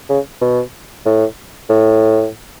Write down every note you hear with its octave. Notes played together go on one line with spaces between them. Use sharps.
C#3
B2
A2
A2